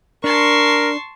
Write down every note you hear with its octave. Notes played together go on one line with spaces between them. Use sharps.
D4 A#4 A5 C6 C#6